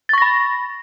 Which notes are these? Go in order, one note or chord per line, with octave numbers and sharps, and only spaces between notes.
B5 C#6 A6 A#6